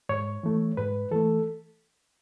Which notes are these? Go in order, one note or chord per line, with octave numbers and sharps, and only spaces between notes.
G#2 C#5
E3 A3
G#2 B4
E3 A3 A4